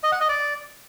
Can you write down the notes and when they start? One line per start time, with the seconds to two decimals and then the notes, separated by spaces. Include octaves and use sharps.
0.03 D#5
0.12 F#5
0.20 D#5
0.29 D5